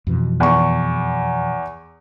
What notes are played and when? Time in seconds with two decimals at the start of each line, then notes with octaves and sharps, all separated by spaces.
0.07 F2 B2 E3
0.40 E2 C#6